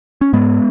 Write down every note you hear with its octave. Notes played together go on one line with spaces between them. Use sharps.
C#4
G#2 G#3 B3